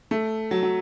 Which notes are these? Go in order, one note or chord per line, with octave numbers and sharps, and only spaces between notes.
A3
F#3
F#3